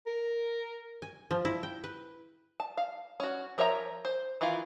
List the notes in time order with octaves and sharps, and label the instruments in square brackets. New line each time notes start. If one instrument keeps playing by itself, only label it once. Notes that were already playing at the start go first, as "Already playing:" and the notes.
[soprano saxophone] A#4
[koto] G#5
F3
E4
G5
B4
[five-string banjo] A5
F5
C#4 F#4
F3 A#4 C#5 E5 A#5
C5
D#3 E3 E4 F4